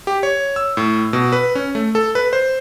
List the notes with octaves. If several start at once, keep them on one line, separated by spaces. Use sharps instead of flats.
G4
C#5
E6
A2
B2
B4
C#4
A3
A4
B4
C5